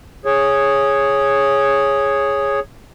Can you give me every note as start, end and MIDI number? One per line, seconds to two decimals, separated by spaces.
0.25 2.60 68
0.25 2.60 73